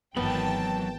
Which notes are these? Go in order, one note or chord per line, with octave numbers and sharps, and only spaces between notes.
G#1 E3 F#3 B3 G5 A5 B5